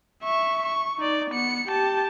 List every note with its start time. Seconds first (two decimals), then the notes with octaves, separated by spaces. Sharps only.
0.23 E5 C#6
0.66 C#6
0.98 D#4 D5
1.31 B3 C#7
1.68 G4 A5